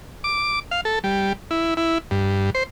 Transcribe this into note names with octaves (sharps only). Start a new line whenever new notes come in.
D6
F5
A4
G3
E4
E4
G2
C5